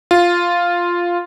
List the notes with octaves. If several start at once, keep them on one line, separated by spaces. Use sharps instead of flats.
F4